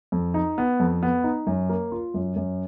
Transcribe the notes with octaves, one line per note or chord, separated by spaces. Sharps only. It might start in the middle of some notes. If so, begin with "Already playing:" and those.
F2
D#4
B3
F2
B3
D#4
F#2
A#3
F4
F#2
F#2